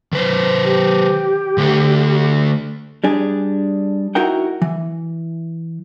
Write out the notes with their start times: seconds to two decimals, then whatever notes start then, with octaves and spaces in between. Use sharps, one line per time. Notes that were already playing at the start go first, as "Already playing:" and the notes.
0.13 D#3 B4 C5
0.64 G4
1.58 D3 A3 A4
3.04 G3 D4 G#4
4.15 D#4 E4 F#4 A#4 F#5 G5
4.62 E3